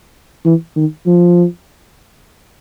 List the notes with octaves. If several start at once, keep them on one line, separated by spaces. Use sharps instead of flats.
E3
D#3
F3